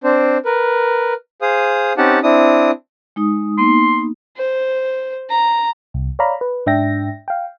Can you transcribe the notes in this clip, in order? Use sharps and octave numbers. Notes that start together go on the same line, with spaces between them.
C4 D4 C5
A#4 B4
G#4 C5 F5 D#6
C4 C#4 D#4 G4 F#5 A5
C4 D4 E4 D#6
G#3 D#4 D#6
A#3 B3 D#4 C6
C5
A#5
C2
C#5 D5 F5 A#5 B5
B4
G#2 D4 E5 G5 A#6
F5 G5